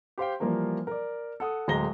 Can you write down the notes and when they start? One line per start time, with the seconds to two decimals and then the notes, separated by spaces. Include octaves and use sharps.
0.18 G4 C5 F5 G5
0.40 E3 F3 G3 A#3 A#4
0.87 A#4 D5
1.40 A4 F#5 D#6
1.68 D1 G#3 A#5 A#6 G7